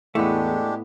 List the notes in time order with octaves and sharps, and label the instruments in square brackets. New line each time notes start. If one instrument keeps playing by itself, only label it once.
[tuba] E2 [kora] A2 B3 [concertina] G#3 D4 G4 [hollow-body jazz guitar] A3